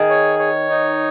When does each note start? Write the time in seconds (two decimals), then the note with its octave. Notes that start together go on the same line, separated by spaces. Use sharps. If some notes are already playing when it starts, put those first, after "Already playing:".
Already playing: D#3 G#4
0.10 C#5
0.39 C#5
0.70 D#4